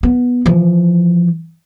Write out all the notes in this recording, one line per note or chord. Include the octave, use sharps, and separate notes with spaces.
B3
E3 F3